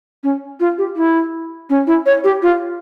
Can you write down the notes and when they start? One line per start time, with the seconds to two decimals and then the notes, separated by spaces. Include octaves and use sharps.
0.23 C#4
0.60 F4
0.78 G4
0.96 E4
1.70 C#4
1.87 E4
2.06 C#5
2.24 G4
2.42 F4